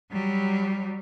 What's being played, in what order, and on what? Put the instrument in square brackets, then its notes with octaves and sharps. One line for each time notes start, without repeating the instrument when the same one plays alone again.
[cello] F#3 G3